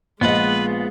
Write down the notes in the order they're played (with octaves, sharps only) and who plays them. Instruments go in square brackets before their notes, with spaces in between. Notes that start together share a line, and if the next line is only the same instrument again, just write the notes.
[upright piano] A#1 D#5 [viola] G#3 [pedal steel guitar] B3 F4 F#5 [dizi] B4